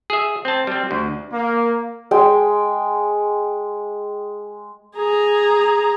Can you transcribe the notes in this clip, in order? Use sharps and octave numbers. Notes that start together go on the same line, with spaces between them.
G#4 E5
C4 A5
G3 C4
D2
A#3
G#3 G5
G#4 A#5